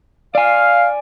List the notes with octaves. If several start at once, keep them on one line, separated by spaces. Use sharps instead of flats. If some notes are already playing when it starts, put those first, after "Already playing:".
D5 F5 G#5